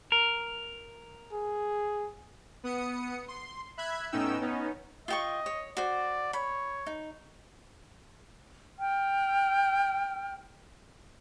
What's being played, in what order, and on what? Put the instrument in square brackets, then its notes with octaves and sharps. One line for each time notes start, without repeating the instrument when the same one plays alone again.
[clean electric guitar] A#4
[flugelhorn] G#4
[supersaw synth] B3 D#6 C#7
C6
E5 B5 F#6 G#6
A2 B3 C#4 D#4 G5 E6
B3 C#4 D#4
[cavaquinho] F4 G5 C#6 [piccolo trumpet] D#5
[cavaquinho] C#5
[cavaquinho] F#4 C5 [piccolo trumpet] D5
[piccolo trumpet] C#5 [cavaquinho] B5
[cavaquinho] D#4
[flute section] G5 F6